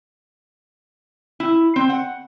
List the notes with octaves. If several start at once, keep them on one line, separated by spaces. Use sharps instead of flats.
E4
C4
F#5